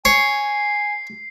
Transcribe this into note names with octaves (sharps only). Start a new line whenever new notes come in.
C#5 G#5 C7